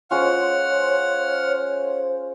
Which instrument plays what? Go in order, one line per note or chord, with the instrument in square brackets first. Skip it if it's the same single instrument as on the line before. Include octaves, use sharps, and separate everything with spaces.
[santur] G#3 C#4 F4 [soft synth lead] C5 [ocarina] C#5 [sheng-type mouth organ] F#5 F6